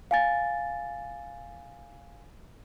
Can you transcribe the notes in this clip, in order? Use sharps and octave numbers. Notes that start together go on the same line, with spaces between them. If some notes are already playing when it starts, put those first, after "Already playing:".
F5 G#5 A6